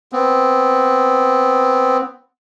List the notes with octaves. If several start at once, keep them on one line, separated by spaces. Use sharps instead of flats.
B3 C4